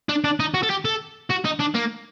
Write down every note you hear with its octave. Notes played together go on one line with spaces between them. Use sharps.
D4
D4
D#4
F#4
A4
G4
A4
F#4
D#4
D4
A#3